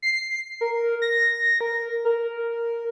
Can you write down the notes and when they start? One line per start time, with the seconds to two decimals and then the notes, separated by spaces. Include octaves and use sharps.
0.02 C7
0.61 A#4
1.02 A#6
1.61 A#4
2.05 A#4